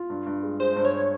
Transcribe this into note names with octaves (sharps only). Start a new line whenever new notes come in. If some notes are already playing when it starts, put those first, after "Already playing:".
Already playing: F4
G2
G2
G#3
G#3 C5
G2
C#5